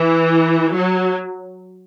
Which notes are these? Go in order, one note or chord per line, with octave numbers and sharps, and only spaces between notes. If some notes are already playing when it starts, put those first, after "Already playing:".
Already playing: E3
F#3